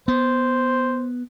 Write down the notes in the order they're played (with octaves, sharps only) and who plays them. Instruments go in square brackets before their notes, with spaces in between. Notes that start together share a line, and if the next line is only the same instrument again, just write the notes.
[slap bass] B3 [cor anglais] C5